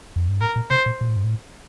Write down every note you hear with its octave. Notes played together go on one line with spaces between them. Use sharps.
F2
G2
A2 A#4
A#2
C3 C5
A#2
A#2
A2
G2
A2